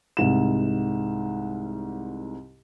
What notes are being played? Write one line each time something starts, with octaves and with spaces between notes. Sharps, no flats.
C2 G#2 E7